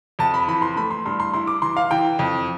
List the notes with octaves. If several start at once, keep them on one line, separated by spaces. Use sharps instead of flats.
F2 A5
B5
E3 B5
C6
A3 B5
C6
G2 C6
C6
E4 C6
D6
E3 C6
F5
E3 G5
F2